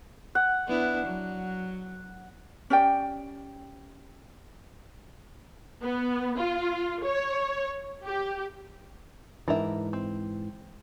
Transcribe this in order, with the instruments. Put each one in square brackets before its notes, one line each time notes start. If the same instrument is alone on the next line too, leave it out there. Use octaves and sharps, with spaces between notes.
[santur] F#5
[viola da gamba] B3 D4 E4
F#3
[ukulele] C#4 G4 D5 G5
[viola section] B3
F4
C#5
G4
[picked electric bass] G#2 E3 [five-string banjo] D4 A#4 E5
[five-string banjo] C4